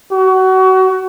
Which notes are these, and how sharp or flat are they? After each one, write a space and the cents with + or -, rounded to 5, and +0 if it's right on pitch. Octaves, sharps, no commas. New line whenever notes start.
F#4 +25